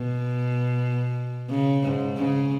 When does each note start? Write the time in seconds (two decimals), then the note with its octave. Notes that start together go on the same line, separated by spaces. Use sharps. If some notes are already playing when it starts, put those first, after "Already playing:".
Already playing: B2
1.50 C#3
1.83 G#2
2.17 C#3